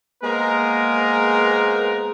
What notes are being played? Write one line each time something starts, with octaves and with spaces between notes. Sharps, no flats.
G#3 A#3 B3 G#4 A#4 C5